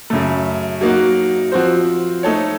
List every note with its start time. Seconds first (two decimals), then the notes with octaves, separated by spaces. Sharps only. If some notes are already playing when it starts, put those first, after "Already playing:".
0.10 F#2 C#3 A3
0.81 F#3 A#3 D#4 F#4
1.52 F3 C4 F#4 C5
2.23 A3 D#4 A4 C#5